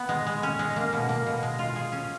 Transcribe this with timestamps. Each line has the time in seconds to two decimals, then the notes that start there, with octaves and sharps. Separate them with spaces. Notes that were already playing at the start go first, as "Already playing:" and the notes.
Already playing: B3
0.09 G#3
0.27 G#3
0.43 C#4
0.59 G#3
0.76 A#3
0.93 B2
1.09 A#3
1.27 B2
1.43 G#3
1.59 F4
1.76 G#4
1.92 C#4